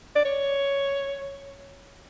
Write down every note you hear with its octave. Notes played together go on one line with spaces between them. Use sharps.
D5
C#5